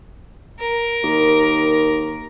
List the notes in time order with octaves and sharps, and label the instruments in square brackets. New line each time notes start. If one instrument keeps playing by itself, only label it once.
[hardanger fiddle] A#4
[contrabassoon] D#2